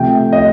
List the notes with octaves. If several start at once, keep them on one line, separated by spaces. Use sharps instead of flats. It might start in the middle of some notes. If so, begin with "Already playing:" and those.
Already playing: C3 F3 A3 G5
D#5